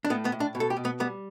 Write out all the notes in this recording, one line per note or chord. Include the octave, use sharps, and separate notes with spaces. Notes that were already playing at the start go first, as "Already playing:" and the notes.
D4
A2 B3
B3
A2
D4
B2
A4
G4
B2
B3
G3 B3